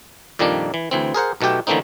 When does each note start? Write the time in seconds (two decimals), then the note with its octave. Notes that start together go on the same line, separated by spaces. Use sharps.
0.39 F2 A#2 D#3 G3 A#3 D4
0.74 E3
0.91 D2 E3 C4
1.14 G#4 A#4 C5 F#5
1.41 B1 B2 A3 G4 G5
1.67 D3 E3 A3 A#3 C4 D#4